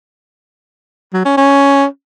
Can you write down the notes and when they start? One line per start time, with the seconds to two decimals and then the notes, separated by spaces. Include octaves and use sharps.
1.13 F#3
1.25 C#4
1.37 C#4